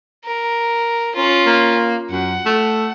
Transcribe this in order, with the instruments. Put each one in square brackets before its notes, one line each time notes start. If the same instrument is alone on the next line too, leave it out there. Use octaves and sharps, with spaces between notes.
[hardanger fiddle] A#4
C#4 F4
[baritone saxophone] A#3
[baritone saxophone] F#2 [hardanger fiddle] F#5
[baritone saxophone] A3